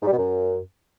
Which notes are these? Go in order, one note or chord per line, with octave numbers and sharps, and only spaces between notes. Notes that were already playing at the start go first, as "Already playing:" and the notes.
G#2
G3
B2
F#2